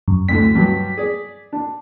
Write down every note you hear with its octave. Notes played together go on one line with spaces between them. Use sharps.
F#2
D2 A2 D3 B6
G2 F#3 G3
G#4 D5
D4